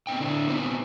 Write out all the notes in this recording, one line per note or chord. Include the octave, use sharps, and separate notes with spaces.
B3 C4 D#4 G5
D3 D4 E4
B3 C4 D#4 F4